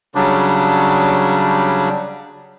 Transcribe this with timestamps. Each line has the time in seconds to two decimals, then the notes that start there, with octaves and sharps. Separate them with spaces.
0.15 C#3 F#3 G3 D4